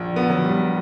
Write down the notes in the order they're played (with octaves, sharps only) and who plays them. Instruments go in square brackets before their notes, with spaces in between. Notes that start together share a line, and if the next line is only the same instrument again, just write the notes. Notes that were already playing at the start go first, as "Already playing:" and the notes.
Already playing: [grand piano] A#1
B3
F#3
G3